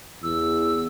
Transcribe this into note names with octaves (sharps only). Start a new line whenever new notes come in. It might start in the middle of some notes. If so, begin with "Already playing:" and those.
E2 E6